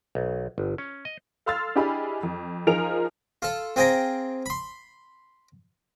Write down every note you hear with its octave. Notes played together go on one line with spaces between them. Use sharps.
B1
G1
C#4
D#5
A4 F5 C6 E6 F6 A6
D4 E4 G4 G#4 D#5 B5
F2
F3 D#4 G#4 A#4 D7 F7
F4 A4
C4 F4 G#4 G5 A#5
B5 C6